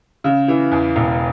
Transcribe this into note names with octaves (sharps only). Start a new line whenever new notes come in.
C#3
E3
E2
E1